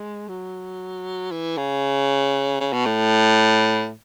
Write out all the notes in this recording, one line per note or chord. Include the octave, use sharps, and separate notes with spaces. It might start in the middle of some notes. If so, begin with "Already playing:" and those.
Already playing: G#3
F#3
E3
C#3
C#3
B2
A2